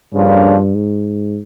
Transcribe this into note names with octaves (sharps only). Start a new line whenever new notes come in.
G2 C#3 F3 A#3 D4 F4
G#2